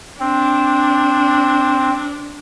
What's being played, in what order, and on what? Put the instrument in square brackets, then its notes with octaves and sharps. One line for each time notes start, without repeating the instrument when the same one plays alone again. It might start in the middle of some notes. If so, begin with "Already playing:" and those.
[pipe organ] C4 [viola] D4